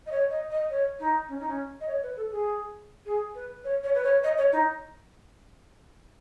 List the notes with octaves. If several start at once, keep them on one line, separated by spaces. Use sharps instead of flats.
D#5
C#5
D#5
D#5
C#5
D#4
C#4
D#4
C#4
D#5
C#5
B4
A4
G#4
G#4
B4
C#5
C#5
B4
C#5
D#5
C#5
D#4